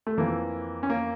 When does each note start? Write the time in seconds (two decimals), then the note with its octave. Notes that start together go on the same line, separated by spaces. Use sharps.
0.07 A3
0.17 F2 E3 A#3
0.83 C#4
0.90 A#3